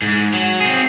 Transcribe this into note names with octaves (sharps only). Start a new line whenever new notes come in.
G#2
F#3
C4 G#4